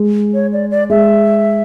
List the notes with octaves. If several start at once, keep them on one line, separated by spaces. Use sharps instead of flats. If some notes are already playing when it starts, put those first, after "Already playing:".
Already playing: G#3
C#5
D5
D5
G#3 E5